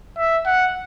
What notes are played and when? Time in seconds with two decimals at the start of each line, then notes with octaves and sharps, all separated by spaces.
0.18 E5
0.46 F#5